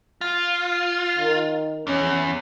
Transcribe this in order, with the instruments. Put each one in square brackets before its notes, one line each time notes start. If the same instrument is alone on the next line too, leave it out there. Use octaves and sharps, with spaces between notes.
[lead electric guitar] F4
[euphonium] D#3
[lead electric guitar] E2 [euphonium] C#4